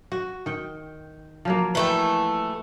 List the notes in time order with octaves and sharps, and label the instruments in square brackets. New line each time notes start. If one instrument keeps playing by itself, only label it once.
[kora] F#4
D#3 G5
F3 F#3 A#3
[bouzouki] E3 A3 G5